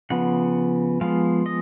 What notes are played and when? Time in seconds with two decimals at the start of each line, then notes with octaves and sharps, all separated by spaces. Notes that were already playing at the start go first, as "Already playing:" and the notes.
0.10 C#3 F3 B3 F#5
1.01 F3 G#3 B3 F5
1.46 D#5